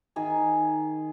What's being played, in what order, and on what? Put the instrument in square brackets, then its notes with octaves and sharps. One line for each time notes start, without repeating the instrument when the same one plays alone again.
[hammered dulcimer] D#3 G#4 G#5